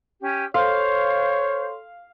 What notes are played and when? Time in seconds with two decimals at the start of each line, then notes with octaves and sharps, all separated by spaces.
0.21 C#4 G4
0.54 A4 C5 C#5 F5 C6